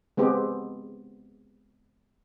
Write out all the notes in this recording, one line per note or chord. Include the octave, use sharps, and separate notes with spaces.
G#3 B3 C4 G4